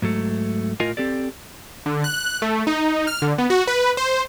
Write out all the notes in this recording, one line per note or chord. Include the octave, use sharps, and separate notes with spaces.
G#2 F#3 A3
A2 F4 A#4 D#5 G#5
C4 G4 A4 D5
D3
F#6
A3
D#4
F6
D3
B3
F#4
B4
C5